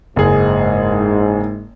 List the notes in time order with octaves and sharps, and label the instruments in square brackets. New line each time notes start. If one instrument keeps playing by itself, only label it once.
[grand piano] F#1 G#4 [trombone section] G#2